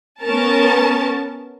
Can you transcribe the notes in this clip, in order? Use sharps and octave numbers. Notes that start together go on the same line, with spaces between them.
B3 C#4 A#4 A5